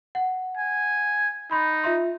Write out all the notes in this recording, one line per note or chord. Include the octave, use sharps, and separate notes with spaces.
F#5
G#5
D#4 B5 C6
F4 E5 C6